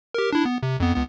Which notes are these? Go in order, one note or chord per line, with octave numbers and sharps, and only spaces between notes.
G4 A#4
D4 E4
B3
C3
F2 B3
C#2 B3